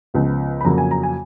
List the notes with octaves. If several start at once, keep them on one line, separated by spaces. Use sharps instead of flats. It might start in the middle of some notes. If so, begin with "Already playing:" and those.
C#2 C#3 F3 B3
B5
F2 C#3 F#3 A#3 A#5
G#5
A#5
G#5